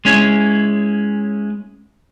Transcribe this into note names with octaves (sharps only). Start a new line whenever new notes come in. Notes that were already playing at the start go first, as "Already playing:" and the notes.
G#3 C#4 E4